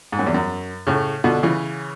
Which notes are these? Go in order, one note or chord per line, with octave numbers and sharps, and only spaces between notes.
G#2
F#2
E2
F#2
A2 C#3
B2 D3
C#3 E3